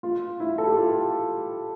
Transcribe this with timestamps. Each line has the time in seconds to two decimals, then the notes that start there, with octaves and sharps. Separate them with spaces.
0.03 F4
0.40 E4
0.58 A4
0.67 G4
0.76 F4